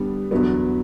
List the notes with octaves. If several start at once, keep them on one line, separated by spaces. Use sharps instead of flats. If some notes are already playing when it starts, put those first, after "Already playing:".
Already playing: D3 G3 B3 D4
E2 D3 F#3 B3